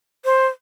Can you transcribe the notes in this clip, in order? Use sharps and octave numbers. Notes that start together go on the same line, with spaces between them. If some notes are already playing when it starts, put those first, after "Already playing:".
C5